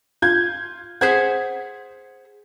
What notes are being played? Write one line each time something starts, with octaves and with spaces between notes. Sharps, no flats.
F4 G6 G#6
G#4 C5 F#5 G#6 B6